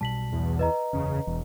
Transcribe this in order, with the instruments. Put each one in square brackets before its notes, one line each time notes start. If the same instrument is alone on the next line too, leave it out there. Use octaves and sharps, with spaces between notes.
[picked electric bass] B1 B2 G3 [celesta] A5 B6 F#7
[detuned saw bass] E2
[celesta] B4 D#5 A#5
[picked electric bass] F#1 E2 [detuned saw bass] C#3
[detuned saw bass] E1 [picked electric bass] E2 E3